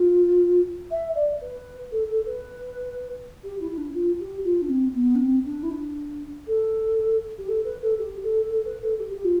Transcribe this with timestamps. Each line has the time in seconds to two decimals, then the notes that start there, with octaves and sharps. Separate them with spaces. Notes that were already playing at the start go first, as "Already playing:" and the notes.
Already playing: F4
0.91 E5
1.15 D5
1.41 B4
1.92 A4
2.09 A4
2.26 B4
3.44 G4
3.60 E4
3.71 E4
3.78 D4
3.94 F4
4.20 G4
4.44 F4
4.62 D4
4.69 C4
4.94 B3
5.15 D4
5.21 C4
5.45 D4
5.63 E4
5.71 D4
6.47 A4
7.38 G4
7.48 A4
7.64 B4
7.82 A4
7.98 G4
8.23 A4
8.49 A4
8.65 B4
8.82 A4
8.99 G4
9.14 G4
9.24 F4